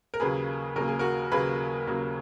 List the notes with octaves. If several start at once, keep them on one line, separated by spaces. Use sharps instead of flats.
A#4
D#2 C#3 F#3 A#3 G#4 B4
D#2 C#3 F#3 A#3 A#4
G#4
F#4 A#4
D#2 C#3 F#3 A#3 G#4 B4
D#2 C#3 F#3 A#3